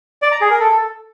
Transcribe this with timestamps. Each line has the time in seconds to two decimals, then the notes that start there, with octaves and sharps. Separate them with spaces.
0.22 D5
0.32 A#5
0.41 G#4
0.50 A#4
0.60 A4